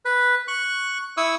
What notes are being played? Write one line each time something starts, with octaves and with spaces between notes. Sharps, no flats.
B4
C#6 F#6
E4 C#6 D#6 E6